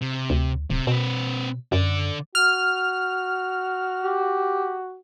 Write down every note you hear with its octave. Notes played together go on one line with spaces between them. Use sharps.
C3
D2
D1 C3
B2 C4 B4
F#2 D3 D5
F#4 F6
G4